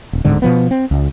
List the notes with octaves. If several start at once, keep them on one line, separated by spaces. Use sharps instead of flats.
D#1
D1 G#2 D3
B2 F3 B3
C4
C#2